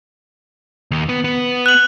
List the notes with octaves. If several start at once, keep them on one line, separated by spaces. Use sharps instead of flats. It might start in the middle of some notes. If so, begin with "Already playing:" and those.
D#2
B3
B3
F#6 F#7